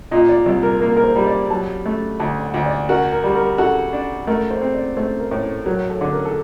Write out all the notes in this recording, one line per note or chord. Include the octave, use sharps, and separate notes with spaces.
A#2 D#5
D5
C2
A#4
A#3 A#4
A#4
C5
G3
D5
F#3 A5
A3
D2 A5
F#5
D2
D5
F#4 A#4
A#4
G3
A#4
F#4 A4
D4
A3 A#4
C5
C4
D5
A3 C5
A#4
A2
A4
F#3 A#4
A4
D3
A#4
A4